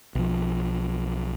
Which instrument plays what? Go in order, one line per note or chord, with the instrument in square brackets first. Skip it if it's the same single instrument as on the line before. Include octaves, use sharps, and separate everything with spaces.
[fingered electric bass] B1 F3